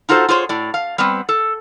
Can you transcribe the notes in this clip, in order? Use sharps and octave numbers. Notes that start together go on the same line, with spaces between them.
D#4 F4 F#4 A4 C5
F4 G#4 C5 C#5
A2 D5
F5
G3 B3 C4
A4